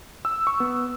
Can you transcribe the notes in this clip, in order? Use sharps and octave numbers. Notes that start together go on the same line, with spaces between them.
E6
C#6
B3